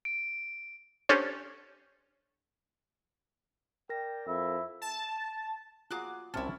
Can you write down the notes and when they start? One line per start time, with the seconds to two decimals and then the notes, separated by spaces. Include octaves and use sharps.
0.05 D7
1.09 C#4 D4 G4 A4 C5 C#5
3.89 A#4 D5 G5 A#6
4.26 F2 E4 E5
4.82 A5
5.91 F4 F#4 G#4 A#5 D6 F#6
6.34 C2 C3 C#4 E4 A5